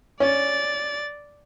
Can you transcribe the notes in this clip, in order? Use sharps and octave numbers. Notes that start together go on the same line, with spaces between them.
C#4 D5 A6